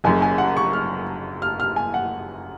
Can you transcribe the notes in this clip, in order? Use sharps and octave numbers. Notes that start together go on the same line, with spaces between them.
F#1 F#2 C#3 G#5
G#5
F#5
C#6
F6
F6
F6
G#5
F#5